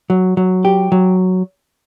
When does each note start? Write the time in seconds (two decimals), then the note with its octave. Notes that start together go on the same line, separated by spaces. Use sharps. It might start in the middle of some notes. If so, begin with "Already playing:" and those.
0.10 F#3
0.37 F#3
0.65 G4
0.92 F#3